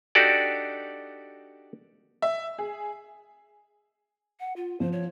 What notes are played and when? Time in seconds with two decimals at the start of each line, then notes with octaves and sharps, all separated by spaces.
0.15 D4 D#4 F#4 G4 A4 D5
2.22 E5
2.58 G#4
4.40 F#5
4.56 F4
4.80 F3 C5
4.92 C#5